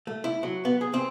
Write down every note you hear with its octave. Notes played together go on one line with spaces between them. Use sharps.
A3
E4
F#3
B3
G#4
C4